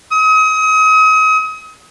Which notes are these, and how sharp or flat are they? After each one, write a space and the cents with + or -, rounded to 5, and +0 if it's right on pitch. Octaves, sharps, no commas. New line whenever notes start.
D#6 +35